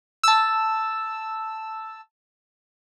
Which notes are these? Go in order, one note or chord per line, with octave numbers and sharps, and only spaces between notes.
A5 E6